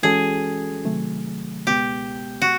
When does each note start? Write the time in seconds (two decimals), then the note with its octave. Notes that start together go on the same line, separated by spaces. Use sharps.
0.03 E3 G#3 C#4 F#4 G#4 A4
0.85 C3 D#3 F#3 A3
1.67 C#2 B2 G#3 B3 G4
2.42 F#4